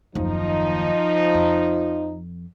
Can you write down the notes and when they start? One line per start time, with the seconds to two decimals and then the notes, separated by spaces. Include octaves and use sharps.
0.15 F#1 D#2 F3 D#4
1.34 F2